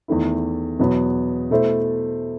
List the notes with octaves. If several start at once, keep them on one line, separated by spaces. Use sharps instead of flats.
E2 D#3 A3 E4
E2 B2 F#3 B3
B2 A3 E4 A4 C5